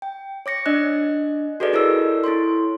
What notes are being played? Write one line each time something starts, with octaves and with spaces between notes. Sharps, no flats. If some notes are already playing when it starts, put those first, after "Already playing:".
G5
C#5 D6 A#6 C#7
D4 D5 D#5 F#6
F#4 G#4 A4 B4 D5 D#5
E4 A4 A#4 C#5 E6
E4 A4 C#5 C6